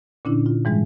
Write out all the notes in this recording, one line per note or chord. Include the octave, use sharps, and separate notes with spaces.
A#2 D3 C#4 D4 E4
F4
G#2 E3 G3 G#3